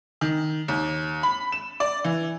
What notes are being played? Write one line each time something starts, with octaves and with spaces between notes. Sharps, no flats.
D#3
D#2
B5
E7
D5
E3